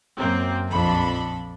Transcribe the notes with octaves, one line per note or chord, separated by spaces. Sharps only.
F#2 A#3 C4
A#1 F2 F3 D4 A4 B5